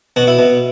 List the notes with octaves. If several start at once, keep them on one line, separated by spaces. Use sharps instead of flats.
B2 F#4
E4
B2